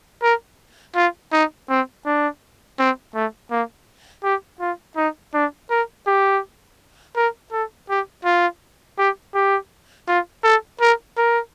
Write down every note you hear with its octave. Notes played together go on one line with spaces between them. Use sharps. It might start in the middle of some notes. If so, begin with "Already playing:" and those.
A#4
F4
D#4
C4
D4
C4
A3
A#3
G4
F4
D#4
D4
A#4
G4
A#4
A4
G4
F4
G4
G4
F4
A4
A#4
A#4